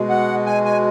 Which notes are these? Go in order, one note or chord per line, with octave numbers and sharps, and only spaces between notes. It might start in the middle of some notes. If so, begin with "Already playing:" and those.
Already playing: B2 G#3
F#5
G#5
G#5